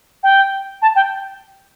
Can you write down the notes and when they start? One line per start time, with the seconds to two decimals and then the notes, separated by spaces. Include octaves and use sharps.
0.23 G5
0.82 A5
0.95 G5